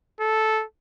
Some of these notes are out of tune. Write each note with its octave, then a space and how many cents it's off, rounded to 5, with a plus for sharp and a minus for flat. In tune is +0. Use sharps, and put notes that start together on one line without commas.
A4 -10